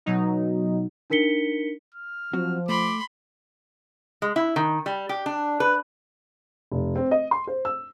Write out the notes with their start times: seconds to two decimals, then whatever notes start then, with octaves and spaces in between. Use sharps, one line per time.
0.06 B2 F#3 D#4
1.10 D4 D#4 A#4 B6 C#7 G7
1.95 F6
2.33 F3 F#3 C4 F#4
2.69 A3 B5 C6 D6
4.22 G#3
4.36 E4
4.56 D#3
4.86 G3
5.09 G4
5.26 D4
5.60 B4
6.72 F1
6.96 C4
7.11 D#5
7.31 C6
7.47 C5
7.65 E6